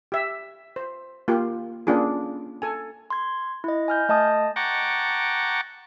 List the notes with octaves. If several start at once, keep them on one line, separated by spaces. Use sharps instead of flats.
G4 E5
C5
A#3 F4 G4
A#3 C#4 D4 F4 G#4
A4 G#5
C6 G#6
E4 D#5
G#5 F6 G6
A3 D#5 A5 D#6
F#5 G5 A5 A#5 C#6 D6